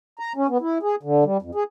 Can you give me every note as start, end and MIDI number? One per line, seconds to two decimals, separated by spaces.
0.19 0.33 82
0.36 0.47 61
0.49 0.58 59
0.61 0.78 64
0.83 0.95 68
1.03 1.24 50
1.24 1.37 55
1.42 1.51 41
1.55 1.63 68